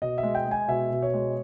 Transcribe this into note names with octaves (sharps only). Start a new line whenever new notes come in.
B2 D#5
E5
G#3
G5
G#3
G#5
B2 E5
B2
C#5
G#3